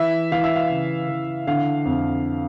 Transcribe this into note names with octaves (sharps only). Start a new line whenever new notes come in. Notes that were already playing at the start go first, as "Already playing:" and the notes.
Already playing: E3 E5
E3 F5
E5
F5
C#3
E3
D3 F5
F2